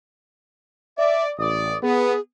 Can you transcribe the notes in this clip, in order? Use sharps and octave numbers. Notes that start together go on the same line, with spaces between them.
D5 E5
A1 D5 D#6
B3 G#4